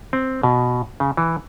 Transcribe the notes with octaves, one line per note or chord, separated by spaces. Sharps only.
C4
B2
C#3
E3